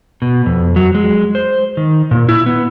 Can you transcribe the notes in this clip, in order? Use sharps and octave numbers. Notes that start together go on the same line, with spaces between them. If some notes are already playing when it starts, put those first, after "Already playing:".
B2
F2
F#3
G#3
C5
D#3
A#2
E4
B3